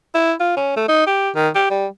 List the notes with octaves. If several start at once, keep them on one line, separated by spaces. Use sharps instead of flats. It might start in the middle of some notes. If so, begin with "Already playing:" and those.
E4
F4
C#4
A3
D#4
G4
D#3
G4
G3